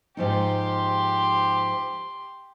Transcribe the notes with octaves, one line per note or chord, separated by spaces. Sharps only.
G#2 F3 D#4 G4 C6